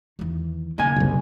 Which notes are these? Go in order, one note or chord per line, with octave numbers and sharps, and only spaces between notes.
E2 D#3
B1 C#3 A#3 G#5
F#1 C2